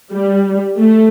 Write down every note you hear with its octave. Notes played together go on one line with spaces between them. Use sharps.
G3
A3